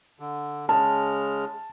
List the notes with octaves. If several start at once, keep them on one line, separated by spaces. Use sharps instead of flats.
D3
C#3 G#3 A5 F6